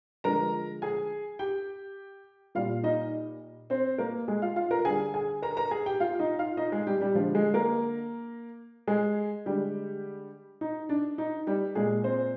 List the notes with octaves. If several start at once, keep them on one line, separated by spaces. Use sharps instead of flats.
D3 F3 G#3 A#4 A#5
G#4 G#5
G4 G5
A#2 G3 F4 F5
D#4 D#5
C4 C5
A#3 A#4
G#3 G#4
F4 F5
F4 F5
A#4 A#5
D3 G3 G#4 G#5
G#4 G#5
A#4 A#5
A#4 A#5
G#4 G#5
G4 G5
F4 F5
D#4 D#5
F4 F5
D#4 D#5
G#3 G#4
G3 G4
G3 G4
D3 F3 G#3 F4
G#3 G#4
A#3 A#4
G#3 G#4
D3 G3 G#3 G4
D#4
D4
D#4
G3 G4
A#2 G#3 G#4
C4 C5